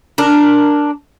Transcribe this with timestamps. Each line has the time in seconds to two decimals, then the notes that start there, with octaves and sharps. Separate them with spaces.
0.18 D4 A#4